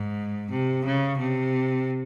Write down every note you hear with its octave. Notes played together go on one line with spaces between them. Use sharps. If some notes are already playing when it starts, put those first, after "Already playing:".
Already playing: G#2
C3
C#3
C3